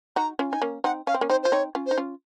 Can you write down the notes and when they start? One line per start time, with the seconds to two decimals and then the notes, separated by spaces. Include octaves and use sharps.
0.16 D#4 F#4 A#5
0.39 C#4 F4
0.50 D#4 G#5
0.62 A#3 C#4
0.84 C4 D#4 F#5
1.07 C#4 F5
1.14 C4
1.21 A#3 C#4
1.30 C4 D#4 C5
1.43 F4 C5
1.52 C4 D#4 C#5
1.75 C#4 F4
1.86 D#4 C5
1.98 C#4 F4